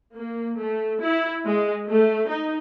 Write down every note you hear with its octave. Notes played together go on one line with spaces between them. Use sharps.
A#3
A3
E4
G#3
A3
D#4